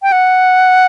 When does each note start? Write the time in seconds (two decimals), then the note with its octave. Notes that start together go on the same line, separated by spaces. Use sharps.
0.02 G5
0.12 F#5